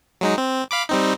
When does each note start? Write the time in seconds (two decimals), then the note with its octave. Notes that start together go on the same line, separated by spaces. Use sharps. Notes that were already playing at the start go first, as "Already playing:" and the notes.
0.21 F#3 G#3 D#4
0.38 C4
0.71 F5 B5 D6
0.89 G3 C4 D#4